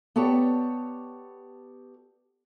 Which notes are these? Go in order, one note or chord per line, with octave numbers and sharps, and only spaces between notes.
B3 G4 A4 C#5 D5 A5